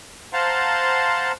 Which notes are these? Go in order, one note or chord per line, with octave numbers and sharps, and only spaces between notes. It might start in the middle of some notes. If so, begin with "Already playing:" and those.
C5 F5 F#5 A5 A#5 C6